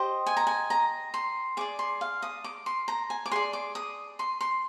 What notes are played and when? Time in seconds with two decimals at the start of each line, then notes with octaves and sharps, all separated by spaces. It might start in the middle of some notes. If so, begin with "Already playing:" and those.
Already playing: G4 C5 D#5
0.26 G#5
0.37 A#5
0.47 G#5
0.70 A#5
1.14 C6
1.57 G#4 D5 D6
1.79 C6
2.01 F5
2.22 D#6
2.44 D6
2.66 C6
2.88 A#5
3.10 G#5
3.26 D6
3.31 G#4 D5 C6
3.53 D6
3.75 D#6
4.19 C6
4.41 C6